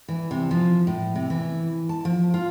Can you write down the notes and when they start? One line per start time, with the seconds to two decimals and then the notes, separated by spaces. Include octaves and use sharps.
0.08 E3
0.31 C3
0.51 F3
0.87 A2
1.15 C3
1.30 E3
1.89 A5
2.05 F3
2.34 F4